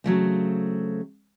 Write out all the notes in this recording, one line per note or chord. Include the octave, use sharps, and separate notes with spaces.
C#3 F#3 A3 C4